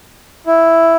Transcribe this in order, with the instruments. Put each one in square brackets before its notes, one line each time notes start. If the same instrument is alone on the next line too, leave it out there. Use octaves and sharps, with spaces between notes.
[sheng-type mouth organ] E4